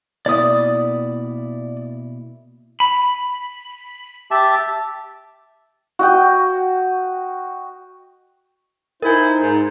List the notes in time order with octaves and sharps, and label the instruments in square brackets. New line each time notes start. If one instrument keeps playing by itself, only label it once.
[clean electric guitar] B2 A#3 E4 [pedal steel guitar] D5 D#6
[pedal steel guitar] B5
[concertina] G4 E5 A5
[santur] F#4 D#5 G5
[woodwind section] D#4 C5 [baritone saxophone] E4 [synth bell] A#4 G#5
[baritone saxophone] G#2